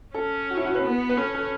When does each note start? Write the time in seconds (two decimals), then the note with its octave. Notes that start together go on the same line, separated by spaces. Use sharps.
0.14 C#4 A4
0.50 F#4
0.57 E4
0.66 F#4
0.75 B4
0.84 B3
1.10 B4
1.17 C#4 A4
1.35 A4